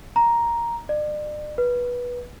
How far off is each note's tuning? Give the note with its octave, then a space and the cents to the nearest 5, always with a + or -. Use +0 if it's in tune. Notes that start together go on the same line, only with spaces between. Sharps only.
A#5 +5
D5 +40
B4 -15